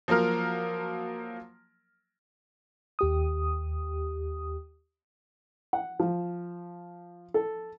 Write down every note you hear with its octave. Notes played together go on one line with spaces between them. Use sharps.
F3 F#3 A#3 A#4 F6
D#2 G4 D#6
F#5
F3
A4